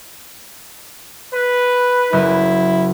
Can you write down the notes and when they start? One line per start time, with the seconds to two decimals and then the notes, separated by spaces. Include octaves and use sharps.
1.32 B4
2.13 F#1 E4